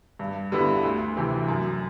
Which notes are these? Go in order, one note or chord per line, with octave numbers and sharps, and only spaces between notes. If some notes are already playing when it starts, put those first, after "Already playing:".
G2
D3 G3 B3 E4
D2
C3 E3
F#2